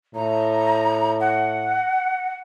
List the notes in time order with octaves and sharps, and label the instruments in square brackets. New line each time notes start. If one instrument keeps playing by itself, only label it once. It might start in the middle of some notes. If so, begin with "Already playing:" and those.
[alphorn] A2 [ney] A#5
[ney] F#5